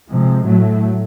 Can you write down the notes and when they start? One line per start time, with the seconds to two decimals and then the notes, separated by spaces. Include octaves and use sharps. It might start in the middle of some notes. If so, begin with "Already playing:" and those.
0.08 C3 F3 G#3
0.44 A2 F#3 A3